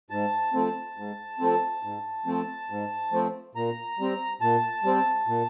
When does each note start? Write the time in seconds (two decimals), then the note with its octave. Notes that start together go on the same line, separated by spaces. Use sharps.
0.10 G#2 A5
0.53 F3 A3 C4
0.97 G#2
1.40 F3 A3 C4
1.83 G#2
2.26 F3 A3 C4
2.70 G#2
3.12 F3 A3 C4
3.55 A#2 A#5
3.99 G3 C4
4.41 A#2 A5
4.84 G3 C4
5.27 A#2